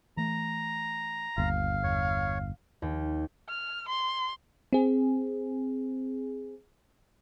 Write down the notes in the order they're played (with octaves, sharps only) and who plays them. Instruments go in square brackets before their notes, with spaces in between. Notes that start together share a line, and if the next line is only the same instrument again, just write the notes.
[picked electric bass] E3 A3 [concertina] A#5
[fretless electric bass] G1 [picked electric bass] D#2 [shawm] F5
[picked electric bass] E2 [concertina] C#5
[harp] D#2
[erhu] F6
C6
[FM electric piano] C4 G#4